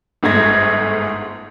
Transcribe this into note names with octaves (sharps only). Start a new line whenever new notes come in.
G1 G#2 A3 G#6 A#6